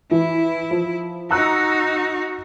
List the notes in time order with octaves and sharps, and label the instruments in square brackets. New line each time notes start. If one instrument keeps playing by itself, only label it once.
[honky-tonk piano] E3 [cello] E4
[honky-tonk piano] F3
[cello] D#4 F#4 [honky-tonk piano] A#5 E6 F#6